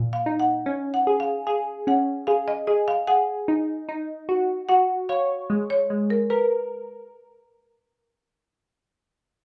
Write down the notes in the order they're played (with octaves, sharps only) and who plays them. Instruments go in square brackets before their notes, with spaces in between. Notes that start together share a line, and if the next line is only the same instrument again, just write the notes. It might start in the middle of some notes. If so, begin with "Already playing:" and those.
Already playing: [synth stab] A#2
[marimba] F5
[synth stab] D#4
[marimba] F#5
[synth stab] C#4
[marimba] F#5
[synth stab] G#4
[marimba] F5
[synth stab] G#4 [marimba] F5
[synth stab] C#4 [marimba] F#5
[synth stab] G#4 [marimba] F5
[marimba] D#5
[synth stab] G#4 [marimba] D#5
[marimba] F5
[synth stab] G#4 [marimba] F#5
[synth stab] D#4
D#4
F#4
[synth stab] F#4 [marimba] F#5
[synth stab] C#5 [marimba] F5
[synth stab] G#3
[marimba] C#5
[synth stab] G#3
[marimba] A#4
[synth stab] A#4 [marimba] B4